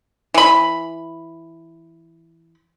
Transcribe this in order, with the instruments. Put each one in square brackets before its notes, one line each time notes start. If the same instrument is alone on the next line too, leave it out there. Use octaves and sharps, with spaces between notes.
[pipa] E3 B5